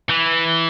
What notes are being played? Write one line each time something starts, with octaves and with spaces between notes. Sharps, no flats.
E3